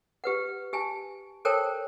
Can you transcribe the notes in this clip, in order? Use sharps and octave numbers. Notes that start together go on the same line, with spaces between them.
G4 B4 F#5
G4 G#5 A5
A4 A#4 C5 C#5 G5 A5